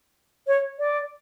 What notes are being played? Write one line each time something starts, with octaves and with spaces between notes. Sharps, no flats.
C#5
D5